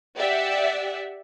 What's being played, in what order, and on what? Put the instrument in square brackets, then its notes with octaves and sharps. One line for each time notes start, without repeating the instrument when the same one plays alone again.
[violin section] G4 D5 E5 F#5